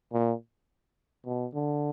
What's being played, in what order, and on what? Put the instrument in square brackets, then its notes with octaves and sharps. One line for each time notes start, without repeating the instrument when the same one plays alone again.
[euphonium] A#2
B2
D3